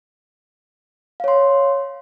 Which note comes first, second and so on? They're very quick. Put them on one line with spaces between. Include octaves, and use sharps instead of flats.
F5 C#5 C6